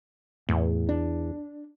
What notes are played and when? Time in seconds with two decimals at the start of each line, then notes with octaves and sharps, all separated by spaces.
0.49 E2 A2
0.89 D4